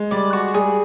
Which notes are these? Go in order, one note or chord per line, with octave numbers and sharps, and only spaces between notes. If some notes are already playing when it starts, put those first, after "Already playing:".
Already playing: G#3
G3 D5
F#4
G3 G#4